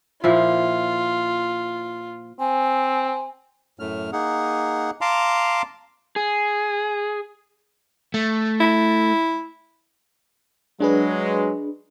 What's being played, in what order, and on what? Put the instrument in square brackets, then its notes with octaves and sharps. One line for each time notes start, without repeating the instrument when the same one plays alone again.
[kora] A#2 F3 E4 [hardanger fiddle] F4
[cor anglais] C4 [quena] G#5
[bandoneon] F#2 A2 A3 F6
A#3 D#4 G#4 F#5
F5 A5 A#5 C6 D6
[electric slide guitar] G#4
[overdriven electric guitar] A3
[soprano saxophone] E4
[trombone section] F#3 G#3 [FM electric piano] D4 G#4 B4